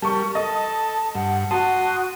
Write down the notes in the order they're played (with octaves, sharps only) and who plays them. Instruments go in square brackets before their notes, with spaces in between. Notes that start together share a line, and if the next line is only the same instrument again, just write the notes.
[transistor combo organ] G3 [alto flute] A#4 [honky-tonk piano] A5 C#6
[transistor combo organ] A4 [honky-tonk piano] D#5 [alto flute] A5
[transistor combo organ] G2 [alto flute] F#5
[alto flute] F#4 [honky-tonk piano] A5 [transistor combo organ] C6 D#6